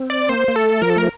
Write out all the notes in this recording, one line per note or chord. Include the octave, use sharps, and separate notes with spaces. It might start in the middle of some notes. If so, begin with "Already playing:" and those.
Already playing: C4
D5
A#3 C5
A#3
A3 A4
F3 A#4
A4
A3 A#4